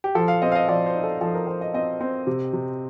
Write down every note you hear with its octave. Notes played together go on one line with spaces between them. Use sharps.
G4
F3 A4
F5
C4 D#5
F5
D#5
F3 D5
C5
D#4
A4
F3 A4
A#4
F3 C5
D#5
C4 D#5
C4
C3
C3